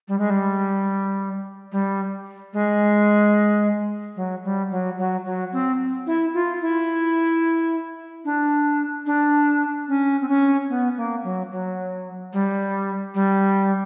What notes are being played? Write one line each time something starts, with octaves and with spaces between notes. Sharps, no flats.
G3
G#3
G3
G3
G#3
F#3
G3
F#3
F#3
F#3
C4
E4
F4
E4
D4
D4
C#4
C4
C#4
B3
A#3
F#3
F#3
G3
G3